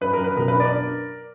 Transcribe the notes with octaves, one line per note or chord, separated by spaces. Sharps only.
F#2 B4
A#4
F#2
B4
B2 A#4
B4
D4
A#4 D5